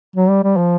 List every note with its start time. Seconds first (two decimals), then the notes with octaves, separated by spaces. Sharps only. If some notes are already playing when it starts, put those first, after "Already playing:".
0.16 F#3
0.30 G3
0.43 G3
0.57 F3